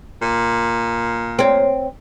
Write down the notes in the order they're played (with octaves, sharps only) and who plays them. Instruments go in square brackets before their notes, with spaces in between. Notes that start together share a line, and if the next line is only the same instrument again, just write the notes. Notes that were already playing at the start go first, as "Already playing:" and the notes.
[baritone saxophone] A#2
[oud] C4 C#5